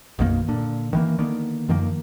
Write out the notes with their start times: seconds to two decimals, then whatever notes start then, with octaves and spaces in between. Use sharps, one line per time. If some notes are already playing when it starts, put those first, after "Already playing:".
0.19 B1 F#2 D#3 A#3
0.49 A#2 D3
0.93 D#3 E3 A#3
1.18 D3 D#3 A#3 B3
1.69 F#2 D#3 F3 A#3